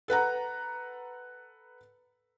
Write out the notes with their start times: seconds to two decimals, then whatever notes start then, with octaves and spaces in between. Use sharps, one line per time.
0.08 A4 B4 F#5 A#5